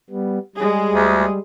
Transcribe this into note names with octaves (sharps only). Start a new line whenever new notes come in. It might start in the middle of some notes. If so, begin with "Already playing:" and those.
G3 B3
G3 G#3 G#4
D2